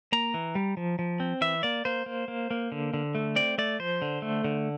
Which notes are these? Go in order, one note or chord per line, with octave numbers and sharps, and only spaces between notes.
A#3 A#5
E3
G3
F3
F3
C4
E3 E5
A#3 D5
A#3 C5
A#3
A#3
A#3
D3
D3
A3
C4 D5
A3 D5
F3 C5
D3
A3
D3